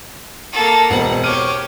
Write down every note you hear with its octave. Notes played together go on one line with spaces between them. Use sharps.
A#3 A4
E1 B2 C4 F#5
G4 C#5 F6 D#7